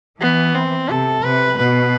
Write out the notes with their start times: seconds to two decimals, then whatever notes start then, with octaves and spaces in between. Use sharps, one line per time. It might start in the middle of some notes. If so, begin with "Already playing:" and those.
0.21 E3 B3
0.55 C4
0.89 C3 A4
1.24 C3 B4
1.58 B2 B4